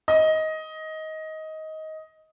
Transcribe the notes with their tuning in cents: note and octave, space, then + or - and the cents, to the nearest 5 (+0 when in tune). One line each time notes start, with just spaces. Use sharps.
D#5 +15